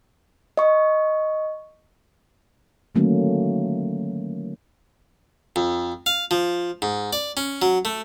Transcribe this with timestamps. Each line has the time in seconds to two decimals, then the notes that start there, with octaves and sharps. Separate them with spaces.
0.57 D#5 C#6
2.95 D3 D#3 F#3 A3 A#3 C#4
5.56 F2
6.06 F5
6.31 F3
6.82 G#2
7.13 D5
7.37 C#4
7.62 F#3
7.85 A3